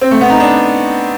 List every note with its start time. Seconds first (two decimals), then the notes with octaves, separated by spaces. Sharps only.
0.01 C4
0.11 A3
0.21 B3
0.30 D#4
0.40 D4